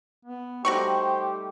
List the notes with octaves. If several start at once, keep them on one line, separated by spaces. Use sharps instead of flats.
B3
G3 A3 D#4 F#4 G4 C5 D5 C#6